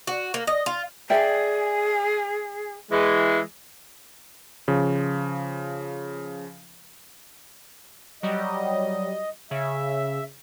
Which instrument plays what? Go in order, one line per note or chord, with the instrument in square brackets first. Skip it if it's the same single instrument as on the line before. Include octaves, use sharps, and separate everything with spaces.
[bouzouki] F#4
A#3
D#5
F4
[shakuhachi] G#4 [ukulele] D5 E5 G5
[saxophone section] E3 G#3
[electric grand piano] C#3 F3
[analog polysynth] F#3 G3 [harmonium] D#5
[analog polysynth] C#3 [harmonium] E5